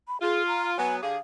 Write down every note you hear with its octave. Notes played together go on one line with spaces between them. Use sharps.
B5
F4 G#4
A#5
F#3 B3 G#5
D3 G4 G#4 F5